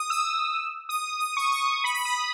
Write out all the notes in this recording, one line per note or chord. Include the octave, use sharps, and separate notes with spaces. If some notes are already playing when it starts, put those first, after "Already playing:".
Already playing: D#6
E6
D#6
D#6
C#6
D#6
B5
B5
D#6